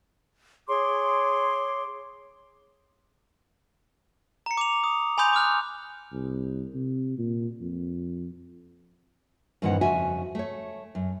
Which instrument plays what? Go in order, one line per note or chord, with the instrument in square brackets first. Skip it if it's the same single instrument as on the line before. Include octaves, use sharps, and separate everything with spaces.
[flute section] G#4 C#5 C6 D6
[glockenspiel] A#5 C#7
D6 F7
D#6
G#5 B5 C6 D#6 G6 F7
D6 D#6 F6 F#6
[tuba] C2
C3
A#2
F2
[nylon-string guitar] G2 A#2 D#3 E3 C4 F#5
F2 C#3 F#4 E5 G#5
A3 C#5
F#2